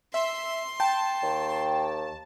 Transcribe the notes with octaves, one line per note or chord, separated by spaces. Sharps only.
E5 C6
G5 A5
D#2